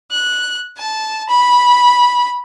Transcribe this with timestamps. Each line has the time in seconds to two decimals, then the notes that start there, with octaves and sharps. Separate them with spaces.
0.11 F#6
0.77 A5
1.28 B5